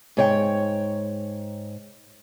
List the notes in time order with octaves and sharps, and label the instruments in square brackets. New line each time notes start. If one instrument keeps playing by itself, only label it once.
[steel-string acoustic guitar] G#2 C#5 G5